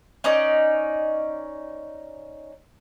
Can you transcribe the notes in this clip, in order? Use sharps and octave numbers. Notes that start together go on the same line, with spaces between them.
C#4 D#4 D5 D#5